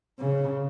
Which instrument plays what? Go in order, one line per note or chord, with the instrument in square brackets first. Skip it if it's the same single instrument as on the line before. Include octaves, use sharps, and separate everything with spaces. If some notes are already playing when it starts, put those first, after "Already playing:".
[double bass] C#3